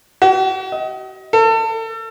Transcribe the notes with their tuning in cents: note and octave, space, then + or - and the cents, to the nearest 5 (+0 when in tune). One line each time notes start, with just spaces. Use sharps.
F#4 +45
D#5 +30
A4 +35